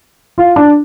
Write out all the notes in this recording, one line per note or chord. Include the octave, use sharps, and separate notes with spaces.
F4
D4